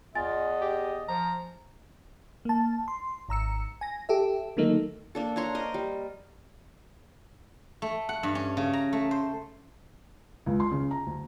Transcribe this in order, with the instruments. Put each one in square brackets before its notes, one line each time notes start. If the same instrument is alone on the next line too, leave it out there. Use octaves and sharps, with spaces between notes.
[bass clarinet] E2 [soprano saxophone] F4 [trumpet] D#5 [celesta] G#5 A6
[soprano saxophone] G4
[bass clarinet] F3 [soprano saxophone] A#5
[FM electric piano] A#3 A5
C6
G#1 A#5 E6 C#7
G#5 A#6
G4 A4 E5
D3 D#3 F#3 A3 A#3 D#4
[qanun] A#3 D4 A4
D4 C#5 A#5 C6
A#4 C5 D#5
G3
[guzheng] A3
F#5
G2
C#4
C#3
A#5
A3
C5
[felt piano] C#2
C6
C#3
A#5
D2